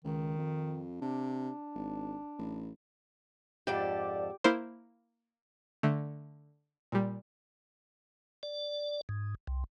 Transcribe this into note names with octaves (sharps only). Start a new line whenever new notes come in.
C#2 D#3
F2
C3 D4
G#1
A1
F2 G#2 G4 A4 D5
A#3 E4 A#4 C5
D3 A3
A#2 G3
D5
G#2
C2